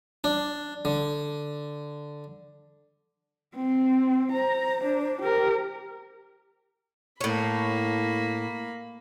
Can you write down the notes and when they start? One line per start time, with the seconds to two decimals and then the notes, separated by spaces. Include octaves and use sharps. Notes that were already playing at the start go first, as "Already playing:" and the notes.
0.24 D4
0.85 D3
3.56 C4
4.32 C5 A#5
4.84 D4
5.22 G4 A#4
7.21 A2 A#3 C#5 B5